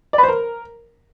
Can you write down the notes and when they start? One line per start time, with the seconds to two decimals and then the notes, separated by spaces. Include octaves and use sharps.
0.13 D5
0.18 B4
0.23 C5
0.28 A#4